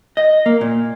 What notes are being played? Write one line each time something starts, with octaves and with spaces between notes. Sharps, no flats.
D#5
A#3
A#2